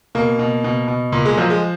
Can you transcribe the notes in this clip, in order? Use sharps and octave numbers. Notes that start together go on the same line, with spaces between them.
B2 A#3
B2
B2
B2
A#2
G#3
F3 F#3
G#3